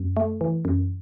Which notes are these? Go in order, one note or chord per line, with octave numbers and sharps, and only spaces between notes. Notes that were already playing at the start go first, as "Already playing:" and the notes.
Already playing: F#2
A3
E3
F#2